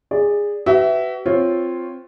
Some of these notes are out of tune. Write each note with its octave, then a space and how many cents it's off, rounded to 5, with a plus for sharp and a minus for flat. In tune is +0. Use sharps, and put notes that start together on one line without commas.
G#4 -15 D5 +0
F#4 +40 B4 +20 E5 +0
C4 +0 F4 +0 C#5 -5